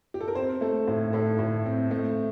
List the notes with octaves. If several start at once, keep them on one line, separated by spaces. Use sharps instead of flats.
G4
A4
A#4
C4 C5
A3 A4
A2
A2 A4
A2
C4
A3